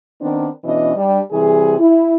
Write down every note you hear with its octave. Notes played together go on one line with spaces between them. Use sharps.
D#3 B3 C4 D4
B2 E3 C#4 D4 D#5
G3 D4
C3 E3 G3 G#4
E4